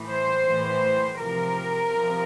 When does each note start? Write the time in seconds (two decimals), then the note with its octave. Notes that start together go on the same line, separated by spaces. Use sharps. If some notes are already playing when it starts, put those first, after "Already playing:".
Already playing: A2 E3
0.09 C5
0.46 A2 E3
1.18 C3 F3 A#4
1.91 C3 F3